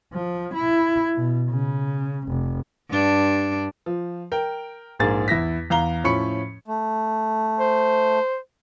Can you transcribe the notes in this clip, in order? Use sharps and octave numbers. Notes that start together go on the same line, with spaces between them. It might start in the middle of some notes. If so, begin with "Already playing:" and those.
F3
E4
B2
C#3
F1
G2 D4
F3
A#4 G5
A#1 G#2 A#3 G#4 A6
E2 E4 A#6 B6
E2 F5 A#5 G7
A2 F3 C#4 B5 C#6 C#7
A3
C5